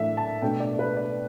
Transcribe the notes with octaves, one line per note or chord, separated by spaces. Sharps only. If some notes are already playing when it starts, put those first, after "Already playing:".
Already playing: A2 E3 A3 D4 E5
A5
B2 A3 D4 G5
D5
B4
D5